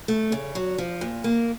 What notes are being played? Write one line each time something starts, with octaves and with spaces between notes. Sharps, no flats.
A3
C#3
F#3
F3
A#2
A#3